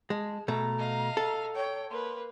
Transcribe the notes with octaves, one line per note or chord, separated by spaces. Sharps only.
G#3 A5
B2 A3 A#5
D#5 F5
A4
C#5 G5
A#3 B4 C6